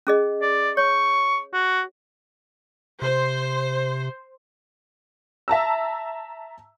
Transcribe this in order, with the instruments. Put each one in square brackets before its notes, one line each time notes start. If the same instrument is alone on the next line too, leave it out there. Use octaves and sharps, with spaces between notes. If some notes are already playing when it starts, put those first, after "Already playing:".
[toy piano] C#4 G#4 D#5
[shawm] D5
[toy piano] C#5 [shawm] C#6
[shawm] F#4
[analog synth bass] C3 [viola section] C5
[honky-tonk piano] E5 A5 A#5 E6